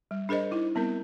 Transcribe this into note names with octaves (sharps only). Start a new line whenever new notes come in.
G3
D4 G#4 A#4 C5 D#5
D#4 E4
G3 B3 C4 A#4